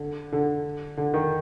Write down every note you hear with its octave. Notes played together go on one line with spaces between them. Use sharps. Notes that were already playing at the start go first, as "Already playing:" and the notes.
Already playing: D3
D3
D3
D#3